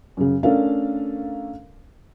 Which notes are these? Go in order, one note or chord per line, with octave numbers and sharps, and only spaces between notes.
F#2 C#3
A3 C#4 D4 A4 A#4 F5